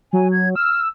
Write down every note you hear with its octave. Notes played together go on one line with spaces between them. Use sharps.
F#3 G#5
G#6
E6 F6